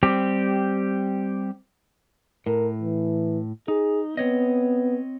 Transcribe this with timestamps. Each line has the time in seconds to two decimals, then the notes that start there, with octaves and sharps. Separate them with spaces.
0.03 G3 C4 G4
2.46 A2 A#4
2.82 E3
3.68 D#4 G#4
4.17 B3 C4 C#5 D#5